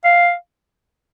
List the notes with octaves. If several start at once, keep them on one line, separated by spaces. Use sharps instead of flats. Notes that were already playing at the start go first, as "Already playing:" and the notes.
F5